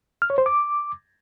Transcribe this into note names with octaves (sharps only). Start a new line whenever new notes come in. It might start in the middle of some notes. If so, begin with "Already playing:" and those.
F6
C#5
C5
D6